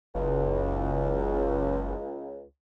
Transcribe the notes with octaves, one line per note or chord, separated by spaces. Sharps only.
F#1 C#2